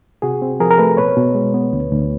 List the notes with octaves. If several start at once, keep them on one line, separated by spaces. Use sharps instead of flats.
C3 F#4 G#4
C4
F3 G#4 A#4
A#4
A3 A4 B4
B2 B4 C#5
B2
G#3
B3
D2
D2